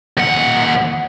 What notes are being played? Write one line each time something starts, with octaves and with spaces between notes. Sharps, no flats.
D#2 F#5